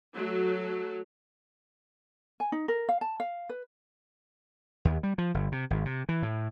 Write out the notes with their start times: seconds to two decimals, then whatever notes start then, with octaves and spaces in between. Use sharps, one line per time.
0.14 F#3 A3
2.40 G#5
2.52 D#4
2.68 A#4
2.89 F5
3.01 A5
3.20 F5
3.49 B4
4.85 D#2
5.03 G3
5.18 F3
5.34 G1
5.52 C3
5.70 G#1
5.85 C3
6.09 E3
6.23 A2